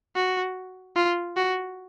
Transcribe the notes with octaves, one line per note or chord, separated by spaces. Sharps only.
F#4
F4
F#4